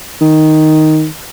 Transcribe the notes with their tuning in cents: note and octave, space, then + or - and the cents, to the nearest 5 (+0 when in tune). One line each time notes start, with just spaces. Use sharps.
D#3 +0